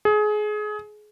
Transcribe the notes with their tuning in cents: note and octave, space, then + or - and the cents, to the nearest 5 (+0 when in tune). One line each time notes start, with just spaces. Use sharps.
G#4 +25